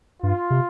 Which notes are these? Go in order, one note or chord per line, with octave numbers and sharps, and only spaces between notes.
G2 F4
C3